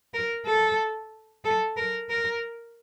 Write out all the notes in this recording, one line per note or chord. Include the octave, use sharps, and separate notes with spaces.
A#4
A4
A4
A#4
A#4